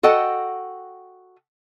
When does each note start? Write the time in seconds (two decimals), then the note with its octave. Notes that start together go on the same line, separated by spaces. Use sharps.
0.03 F#4 A4 D#5 F#5 G5